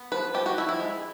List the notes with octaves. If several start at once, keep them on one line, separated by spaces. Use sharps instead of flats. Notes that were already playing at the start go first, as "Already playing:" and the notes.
Already playing: B3
F3 B4
F3 G4
F#4
F3 E4
E4
G#3